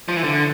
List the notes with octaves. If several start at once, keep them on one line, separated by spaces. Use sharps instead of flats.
F3
E3
D3